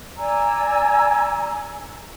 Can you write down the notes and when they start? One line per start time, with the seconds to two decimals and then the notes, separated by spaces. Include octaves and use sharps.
0.17 D5 G#5 A#5 E6